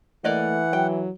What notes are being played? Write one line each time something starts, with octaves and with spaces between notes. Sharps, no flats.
E3 A3 A#3 D5 D#5 F#5
F#3 G5